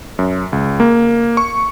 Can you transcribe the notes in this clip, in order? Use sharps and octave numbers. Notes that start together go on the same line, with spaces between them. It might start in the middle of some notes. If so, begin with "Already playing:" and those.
F#2
C#2
A#3
C#6